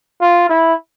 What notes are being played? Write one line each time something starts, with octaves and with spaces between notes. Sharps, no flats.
F4
E4